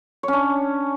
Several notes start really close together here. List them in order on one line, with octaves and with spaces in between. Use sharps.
C#5 C#4 D4